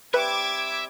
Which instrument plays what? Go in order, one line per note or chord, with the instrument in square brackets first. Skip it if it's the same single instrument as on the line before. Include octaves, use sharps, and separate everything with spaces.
[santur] G3 C4 G4 [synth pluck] B4 [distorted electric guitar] E5 [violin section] D6 G#6